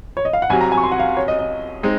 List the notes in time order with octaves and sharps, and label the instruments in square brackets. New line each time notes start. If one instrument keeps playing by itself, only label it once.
[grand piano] C#5
D#5
F5
F#5
[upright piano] C2 C3 F#3 [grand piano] G#5
[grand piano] A#5
G#5
C#6
C6
F#5
F5
C#5
D#5
D#5
[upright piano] G#3 C4 D#4